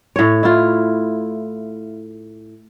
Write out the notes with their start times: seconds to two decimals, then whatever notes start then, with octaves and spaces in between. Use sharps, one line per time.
0.16 A2 C#5
0.43 E4 F4